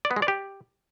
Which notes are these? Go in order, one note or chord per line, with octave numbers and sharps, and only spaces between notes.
D5
B3
G#3
D5
G4